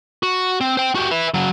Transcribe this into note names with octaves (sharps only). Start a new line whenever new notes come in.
F#4
C4
C5 G5
F#4 G4
B4 E5
C#3 F#3